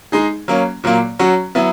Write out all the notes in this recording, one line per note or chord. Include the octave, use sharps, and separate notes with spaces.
G#3 D#4 G#4
F#3 A#3 C#4
A#2 F#3 A#3
F#3 C#4 F#4
F#3 B3 E4